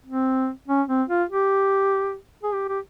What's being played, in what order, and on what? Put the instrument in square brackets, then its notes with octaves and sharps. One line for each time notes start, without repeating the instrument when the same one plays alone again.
[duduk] C4
C#4
C4
F4
G4
G#4
G4
G4